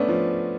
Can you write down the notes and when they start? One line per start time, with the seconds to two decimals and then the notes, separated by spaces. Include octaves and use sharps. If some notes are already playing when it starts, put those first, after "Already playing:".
Already playing: A3 B3 C#4 D4
0.08 F3